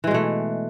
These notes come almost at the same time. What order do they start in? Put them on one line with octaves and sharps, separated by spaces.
E3 G#3 B2 A3